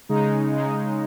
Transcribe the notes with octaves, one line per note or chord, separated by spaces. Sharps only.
C#3 G#3 D#4
C#3 G#3 D#4